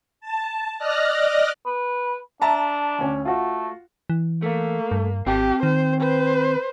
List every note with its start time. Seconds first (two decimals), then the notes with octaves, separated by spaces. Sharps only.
0.20 A5
0.78 D5 D#5 F6 F#6 A#6
1.66 B4
2.42 D4 E5 A5 A#5
2.99 D2 C#4
3.25 A3 F4 F#4
4.10 E3
4.42 A3 A#3
4.91 G2
5.26 G#1 C4 G4 A5
5.63 D#3 C5
6.01 B4 C5